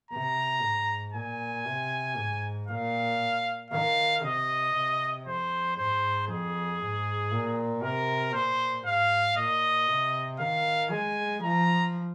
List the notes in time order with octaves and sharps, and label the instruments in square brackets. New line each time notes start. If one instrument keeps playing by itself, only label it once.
[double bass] C3 [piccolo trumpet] A#5
[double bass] G#2
[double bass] A#2 [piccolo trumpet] G#5
[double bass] C3
G#2
[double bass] A#2 [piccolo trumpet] F5
[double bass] D#3 [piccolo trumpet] F5
[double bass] C3 [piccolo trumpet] D#5
[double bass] C3
[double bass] F2 [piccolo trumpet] C5
[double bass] G#2 [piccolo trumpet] C5
[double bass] F2 [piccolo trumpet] G#4
[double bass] G#2
A#2
[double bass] C3 [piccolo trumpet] A#4
[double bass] A#2 [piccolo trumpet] C5
[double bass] G#2 [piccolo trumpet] F5
[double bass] A#2 [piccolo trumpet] D#5
[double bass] C3
[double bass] D#3 [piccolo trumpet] F5
[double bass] G#3 [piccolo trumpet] G#5
[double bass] F3 [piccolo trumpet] A#5